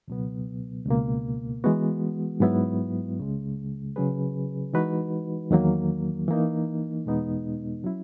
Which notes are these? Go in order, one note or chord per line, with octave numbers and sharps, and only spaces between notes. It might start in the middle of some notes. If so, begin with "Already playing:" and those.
C#2 B2 F#3 B3
C#2 B2 A#3
E3 G#3 B3 F#4
G#2 F#3 B3 E4
C#2 C#3 G#3
C#3 F#3 C#4 G#4 B4
E3 G#3 D#4 F#4 B4
E2 D#3 F#3 A#3
E3 A#3 D#4
E2 B2 G#3 B3 D#4
F#3 C#4 E4